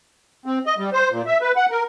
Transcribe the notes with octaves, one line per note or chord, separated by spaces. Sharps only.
C4
D#5
G3
C5
A#2
E5
B4
F#5
A#4